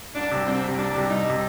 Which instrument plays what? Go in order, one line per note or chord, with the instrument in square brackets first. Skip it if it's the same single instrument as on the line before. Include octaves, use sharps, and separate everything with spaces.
[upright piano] C2 [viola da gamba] D4
[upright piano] C3 G3
[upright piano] C2 [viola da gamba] C4
[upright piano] C3 G3
[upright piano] C2 [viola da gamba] D4
[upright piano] C3 G3
[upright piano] C2 [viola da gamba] D#4
[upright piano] C3 G3